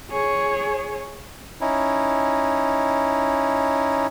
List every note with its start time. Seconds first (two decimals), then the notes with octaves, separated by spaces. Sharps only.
0.11 G#4 C#5
1.61 C#4 D#4 E4